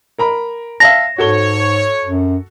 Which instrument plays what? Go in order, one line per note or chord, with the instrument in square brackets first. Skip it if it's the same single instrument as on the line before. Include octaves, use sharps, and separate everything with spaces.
[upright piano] A#4 A#5 B5
[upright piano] E5 F5 A5 [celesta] A#6
[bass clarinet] G#2 [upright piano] F#4 A4 G7 [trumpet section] C#5
[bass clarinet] F#2